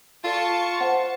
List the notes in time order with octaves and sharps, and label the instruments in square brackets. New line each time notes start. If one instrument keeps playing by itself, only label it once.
[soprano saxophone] F4 [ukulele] A4 D5 [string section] A5 C#6
[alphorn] C5 [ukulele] F#5